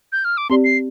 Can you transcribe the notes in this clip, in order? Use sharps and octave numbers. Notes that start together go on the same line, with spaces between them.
G6
F6
D6
C4 G4 D5 C6
C7